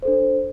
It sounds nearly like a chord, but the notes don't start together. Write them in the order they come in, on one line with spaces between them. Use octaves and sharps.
C5 A4 D4